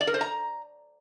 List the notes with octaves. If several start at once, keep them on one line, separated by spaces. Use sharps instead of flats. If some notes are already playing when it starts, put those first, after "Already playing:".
D5
A#4
C5
A#5